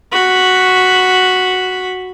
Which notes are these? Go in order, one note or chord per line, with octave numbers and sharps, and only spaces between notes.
F#4 B5